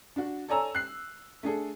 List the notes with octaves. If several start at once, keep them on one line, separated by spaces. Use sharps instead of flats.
D4 F#4
A4 C#5 D5 G#5 A#5 E6
F#6 C7
A3 D4 G#4 A4